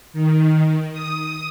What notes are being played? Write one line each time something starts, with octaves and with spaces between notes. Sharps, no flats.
D#3
D#6